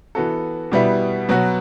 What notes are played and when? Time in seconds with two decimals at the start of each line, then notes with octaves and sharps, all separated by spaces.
0.15 E3 B3 F#4 A4
0.72 B2 G3 B3 E4
1.29 B2 F#3 B3 F#4